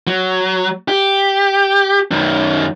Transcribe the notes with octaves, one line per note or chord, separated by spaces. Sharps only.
F#3
G4
F#2 D#3